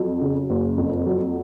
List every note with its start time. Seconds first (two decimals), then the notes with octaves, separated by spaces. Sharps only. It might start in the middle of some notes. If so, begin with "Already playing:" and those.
Already playing: F2 F#3
0.21 C#3
0.50 F#1
0.78 F2
1.06 F#3